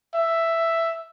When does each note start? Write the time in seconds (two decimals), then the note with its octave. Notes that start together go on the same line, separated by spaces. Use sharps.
0.14 E5